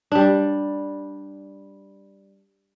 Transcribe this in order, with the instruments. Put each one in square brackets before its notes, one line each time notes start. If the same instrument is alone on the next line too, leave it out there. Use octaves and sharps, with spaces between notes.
[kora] G3 D4